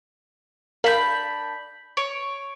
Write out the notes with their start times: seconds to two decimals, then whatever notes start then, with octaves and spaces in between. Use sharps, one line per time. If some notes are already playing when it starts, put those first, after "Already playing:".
0.84 D4 A#4 F5 B5 G6 B6 F#7
1.97 C#5 D7